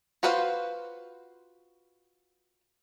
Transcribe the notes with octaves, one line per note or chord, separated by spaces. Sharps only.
F4 F#4 B4 C5 F5